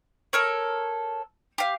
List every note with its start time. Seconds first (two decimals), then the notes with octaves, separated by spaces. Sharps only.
0.33 A4 A#4 C#5
1.58 G4 F5